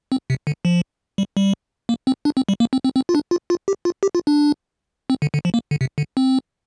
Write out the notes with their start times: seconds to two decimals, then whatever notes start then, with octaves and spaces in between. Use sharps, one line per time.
0.12 C4
0.30 C3
0.47 D3
0.65 F3
1.18 G3
1.37 G3
1.89 A#3
2.07 C4
2.25 D4
2.37 C4
2.49 G3
2.60 A#3
2.73 C4
2.84 C4
2.96 C4
3.09 F4
3.15 D4
3.31 F4
3.50 F4
3.68 G4
3.85 F4
4.03 G4
4.15 F4
4.27 D4
5.10 C4
5.22 D3
5.34 D3
5.45 F3
5.54 A#3
5.71 D3
5.81 C3
5.98 D3
6.17 C4